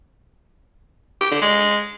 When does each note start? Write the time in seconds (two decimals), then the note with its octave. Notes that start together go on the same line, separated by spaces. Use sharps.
1.21 G4
1.31 D3
1.42 G#3